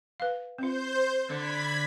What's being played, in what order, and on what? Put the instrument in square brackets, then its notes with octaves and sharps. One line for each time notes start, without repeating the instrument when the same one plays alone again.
[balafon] B4 F5
[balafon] C4 F4 [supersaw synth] C5 G6
[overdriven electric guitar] D3 [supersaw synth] B5 G#6 B6